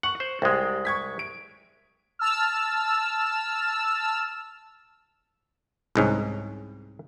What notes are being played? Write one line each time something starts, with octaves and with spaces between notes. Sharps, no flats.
F#5 C#6 C#7
C5
C2 G#3 G4 G5
C#6 G#6 B6
D7
A5 E6 F6
C2 G#2 C#4